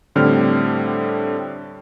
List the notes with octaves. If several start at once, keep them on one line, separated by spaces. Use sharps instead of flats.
A2 D3 G3 C4 F6